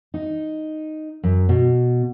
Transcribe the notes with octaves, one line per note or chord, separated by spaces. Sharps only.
D#4
F#2
B2